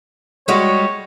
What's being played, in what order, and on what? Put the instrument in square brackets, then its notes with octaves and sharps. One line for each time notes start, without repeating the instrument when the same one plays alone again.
[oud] G3 G#3 F#4 [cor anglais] C#5